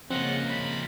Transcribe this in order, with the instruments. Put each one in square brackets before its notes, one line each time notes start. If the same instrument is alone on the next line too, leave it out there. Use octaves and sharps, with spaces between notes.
[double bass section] C#3 A#3 [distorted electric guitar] F3 D#4 [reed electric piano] C4 [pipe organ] F#5
[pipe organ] B5